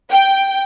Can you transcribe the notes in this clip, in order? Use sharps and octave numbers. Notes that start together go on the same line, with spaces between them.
G5